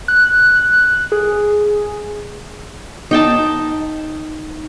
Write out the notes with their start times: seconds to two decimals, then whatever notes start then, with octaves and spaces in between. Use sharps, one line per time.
0.08 F#6
1.12 G#4
3.11 D#4 G5 A5